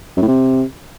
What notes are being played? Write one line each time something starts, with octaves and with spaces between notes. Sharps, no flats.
F#2
A2
C3